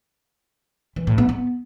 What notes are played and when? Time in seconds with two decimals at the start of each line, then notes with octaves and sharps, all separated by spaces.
0.96 E3
1.07 A2
1.18 B3
1.29 B3